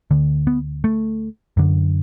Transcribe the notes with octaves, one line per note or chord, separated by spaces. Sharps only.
D2 D3
B3
A3
F#2 D3